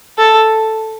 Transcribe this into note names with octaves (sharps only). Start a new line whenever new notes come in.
A4